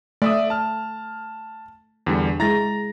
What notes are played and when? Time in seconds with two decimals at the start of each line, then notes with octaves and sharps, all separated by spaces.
0.22 A3 D5 E5 D#6
0.50 A5 F6
2.07 E2 D3 G3
2.40 G#3 E4 A#5 A6 A#6